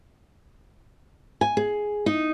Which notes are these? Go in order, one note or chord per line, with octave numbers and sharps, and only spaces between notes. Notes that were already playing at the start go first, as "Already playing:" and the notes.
G#5
G#4
D#4